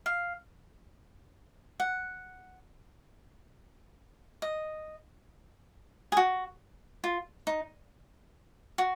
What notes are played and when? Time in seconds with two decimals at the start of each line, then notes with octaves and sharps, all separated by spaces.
0.06 F5
1.80 F#5
4.42 D#5
6.12 G#4
6.17 F#4
7.04 F4
7.47 D#4
8.78 F#4